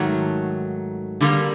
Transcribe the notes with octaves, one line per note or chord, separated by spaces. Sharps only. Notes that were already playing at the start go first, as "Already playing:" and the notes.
Already playing: G#2 D#3 F#3 A3
D3 G3 A#3